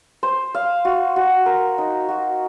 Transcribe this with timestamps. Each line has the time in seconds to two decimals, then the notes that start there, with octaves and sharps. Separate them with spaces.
0.23 C5
0.54 F5
0.85 F#4
1.16 F#4
1.46 A#4
1.78 D#4
2.09 F#4